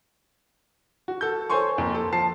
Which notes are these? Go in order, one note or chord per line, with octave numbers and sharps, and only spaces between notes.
F#4
A4 G6
A4 C5 C#5 G#5 C6 C#6
F2 A#3 A#4
A4
F3 A5 C7